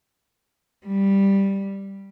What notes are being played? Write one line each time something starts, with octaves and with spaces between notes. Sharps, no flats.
G3